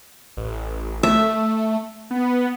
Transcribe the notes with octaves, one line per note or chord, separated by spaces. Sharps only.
A1
A3 E5
B3